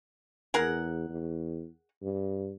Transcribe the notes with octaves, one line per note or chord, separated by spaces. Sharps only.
E2 G#4 A#4 F#5
E2
G2